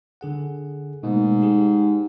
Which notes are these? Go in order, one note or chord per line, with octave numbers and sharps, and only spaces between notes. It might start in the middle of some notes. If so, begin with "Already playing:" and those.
D3 G#4 F#5
G#2 B2 A3 A#3
D#4 G4 G#4